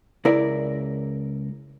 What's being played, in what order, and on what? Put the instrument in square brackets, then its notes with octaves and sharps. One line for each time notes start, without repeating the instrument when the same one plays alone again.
[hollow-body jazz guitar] C#2 E4 A#4 D5